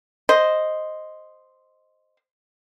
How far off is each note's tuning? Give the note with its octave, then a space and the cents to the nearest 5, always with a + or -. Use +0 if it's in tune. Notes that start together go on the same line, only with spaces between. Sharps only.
C5 +0 D#5 +0